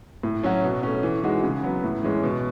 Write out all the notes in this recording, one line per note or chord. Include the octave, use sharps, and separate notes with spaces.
A2
F#3 C#4 F#4
B2
A3 C#4
E3
G#3 D#4 F#4
C#3
F#3 B3
A2
E3 G#3 C#4
B2